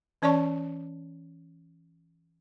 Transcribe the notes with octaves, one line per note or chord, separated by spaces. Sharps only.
E3 C#4 C#5 D5 A5 C#6